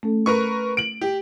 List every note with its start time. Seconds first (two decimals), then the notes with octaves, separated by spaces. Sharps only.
0.03 A3 C#4 A4
0.26 A#4 B4 C#6
0.77 D7 F#7
1.01 G4